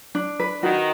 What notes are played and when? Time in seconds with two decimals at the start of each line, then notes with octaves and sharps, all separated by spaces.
0.15 D4
0.39 B4
0.62 D#3 F#4